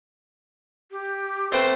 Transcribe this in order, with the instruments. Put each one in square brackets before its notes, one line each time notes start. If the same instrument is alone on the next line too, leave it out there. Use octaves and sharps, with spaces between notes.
[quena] G4
[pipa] A3 B3 C4 [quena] B4 [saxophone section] C5